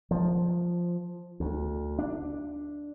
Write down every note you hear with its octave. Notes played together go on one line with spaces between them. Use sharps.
F3
D2
D4